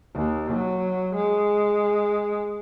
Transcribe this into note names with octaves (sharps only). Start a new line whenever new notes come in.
D#2
F#3
G#3